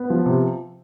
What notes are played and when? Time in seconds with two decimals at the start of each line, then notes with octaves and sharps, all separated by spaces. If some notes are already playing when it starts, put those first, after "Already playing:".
Already playing: B3
0.10 F3
0.26 C3